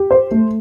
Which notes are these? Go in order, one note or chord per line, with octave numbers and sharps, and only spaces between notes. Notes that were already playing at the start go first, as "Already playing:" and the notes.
Already playing: G4
C5
A3